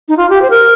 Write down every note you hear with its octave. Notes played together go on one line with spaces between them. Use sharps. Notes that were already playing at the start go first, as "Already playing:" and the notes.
D#4
F4
G4
C5
A#4